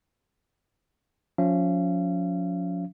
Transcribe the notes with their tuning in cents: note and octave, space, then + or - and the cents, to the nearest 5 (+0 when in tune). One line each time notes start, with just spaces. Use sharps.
F3 +40 C#4 +35 F5 -40